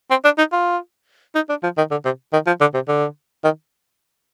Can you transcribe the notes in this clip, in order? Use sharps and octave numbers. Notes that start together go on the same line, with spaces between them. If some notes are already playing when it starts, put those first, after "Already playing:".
C4
D4
D#4
F4
D#4
D4
F3
D#3
D3
C3
D#3
F3
D3
C3
D3
D#3